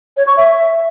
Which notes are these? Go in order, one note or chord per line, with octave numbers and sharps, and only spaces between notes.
C#5
C#6
E5